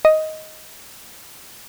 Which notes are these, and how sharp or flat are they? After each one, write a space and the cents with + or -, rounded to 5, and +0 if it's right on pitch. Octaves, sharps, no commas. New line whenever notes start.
D#5 +10